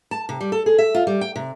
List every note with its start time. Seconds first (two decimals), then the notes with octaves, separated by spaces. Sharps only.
0.11 A5
0.29 C3
0.41 G3
0.52 A4
0.66 G#4
0.78 E5
0.95 F4
1.07 G3
1.21 G5
1.36 C3